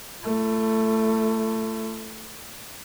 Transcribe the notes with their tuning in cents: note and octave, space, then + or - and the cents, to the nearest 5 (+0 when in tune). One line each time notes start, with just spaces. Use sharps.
A3 +10 E4 +45